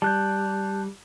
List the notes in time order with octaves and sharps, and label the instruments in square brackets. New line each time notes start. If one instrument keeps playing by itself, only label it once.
[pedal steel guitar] G3 [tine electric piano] A5 F#6 G6